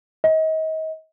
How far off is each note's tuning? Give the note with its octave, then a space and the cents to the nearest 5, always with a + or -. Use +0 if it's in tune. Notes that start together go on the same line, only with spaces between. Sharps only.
D#5 +35